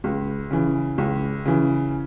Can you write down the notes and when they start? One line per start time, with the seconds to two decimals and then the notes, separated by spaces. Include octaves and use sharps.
0.04 C#2
0.51 C#3 E3
0.98 C#2
1.45 C#3 E3